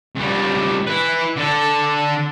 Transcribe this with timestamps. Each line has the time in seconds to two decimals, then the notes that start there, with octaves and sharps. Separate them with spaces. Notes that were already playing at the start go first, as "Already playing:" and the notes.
0.15 C#2 G3
0.87 E4 B4
1.36 D3 A4